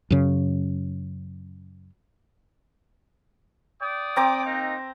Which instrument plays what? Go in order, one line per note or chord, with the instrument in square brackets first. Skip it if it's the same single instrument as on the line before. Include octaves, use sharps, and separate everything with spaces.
[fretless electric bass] F#2 C#3
[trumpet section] D5 G5 D#6
[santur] C4 A#5 D6
[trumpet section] A#3 D#4